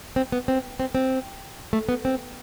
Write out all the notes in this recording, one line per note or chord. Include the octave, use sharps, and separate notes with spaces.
C4
B3
C4
C4
C4
A3
B3
C4